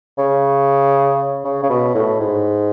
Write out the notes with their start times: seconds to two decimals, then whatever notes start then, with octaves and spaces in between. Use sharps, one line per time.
0.18 C#3
1.45 C#3
1.63 C#3
1.70 B2
1.95 A2
2.20 G#2